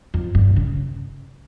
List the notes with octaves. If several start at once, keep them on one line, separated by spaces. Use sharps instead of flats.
F2
G2
C#3